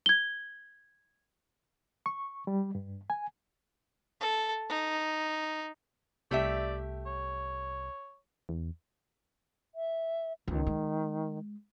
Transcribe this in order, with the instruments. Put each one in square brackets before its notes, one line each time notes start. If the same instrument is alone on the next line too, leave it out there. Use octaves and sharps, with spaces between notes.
[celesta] G#6 G7
[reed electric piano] C#6
G3
G2
G#5
[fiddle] A4
D#4
[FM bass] C2 [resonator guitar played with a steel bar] A3 G4 E5 [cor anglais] D5
[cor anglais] C#5
[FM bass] E2
[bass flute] E5
[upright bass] C#2 [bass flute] D#3
[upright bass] G#3